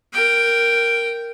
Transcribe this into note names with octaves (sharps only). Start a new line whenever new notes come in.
A#4 G5